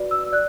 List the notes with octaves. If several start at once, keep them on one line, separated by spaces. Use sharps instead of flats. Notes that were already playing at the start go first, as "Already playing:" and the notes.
Already playing: F#4 B4 D5
E6
D5 F#6